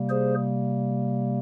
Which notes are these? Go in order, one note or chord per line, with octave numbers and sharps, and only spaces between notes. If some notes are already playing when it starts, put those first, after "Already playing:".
Already playing: C3 G3 A#3
G#4 C5